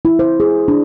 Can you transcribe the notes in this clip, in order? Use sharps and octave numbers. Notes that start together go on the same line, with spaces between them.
E4
C5
G#4
D4